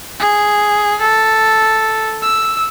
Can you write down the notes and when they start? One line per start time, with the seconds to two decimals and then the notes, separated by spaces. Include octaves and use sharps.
0.20 G#4
1.01 A4
2.22 E6